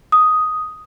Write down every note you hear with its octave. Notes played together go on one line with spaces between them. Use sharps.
D#6